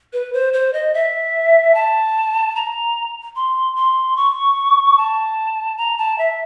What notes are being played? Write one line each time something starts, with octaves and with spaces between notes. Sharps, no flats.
B4
C5
C5
D#5
E5
A5
A#5
C6
C6
C#6
A5
A#5
A5
E5